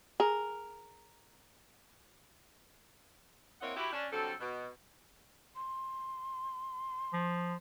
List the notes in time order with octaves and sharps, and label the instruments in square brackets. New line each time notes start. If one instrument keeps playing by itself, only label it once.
[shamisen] G#4 [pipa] A#4
[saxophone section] A#3 C4 E4 C#5 D#5 F#5
E4 F#4 G4
C#4 D4
D3 F#3 G3 C4 A4
B2
[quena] C6
[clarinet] F3